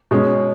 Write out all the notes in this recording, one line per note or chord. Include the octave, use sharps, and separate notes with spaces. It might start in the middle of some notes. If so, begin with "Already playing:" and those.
B2 G#3 C#4